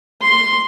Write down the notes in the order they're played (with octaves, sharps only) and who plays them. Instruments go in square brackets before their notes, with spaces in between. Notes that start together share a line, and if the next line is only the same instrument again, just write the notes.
[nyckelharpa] C6